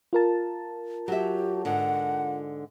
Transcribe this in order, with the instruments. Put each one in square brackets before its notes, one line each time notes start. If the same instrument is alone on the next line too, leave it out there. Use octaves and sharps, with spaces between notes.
[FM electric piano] F4 A#4 A5
[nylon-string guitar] F#3 E5 [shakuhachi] G4
[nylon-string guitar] G#2 D3 [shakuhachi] F#5